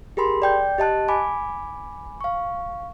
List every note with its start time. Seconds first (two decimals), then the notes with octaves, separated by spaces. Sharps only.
0.17 G4 G#4 A#4 B5 C6
0.42 D5 G5 G6
0.78 G4 D#5 A5 F#6
1.08 G#5 B5 D6
2.21 F5 C#6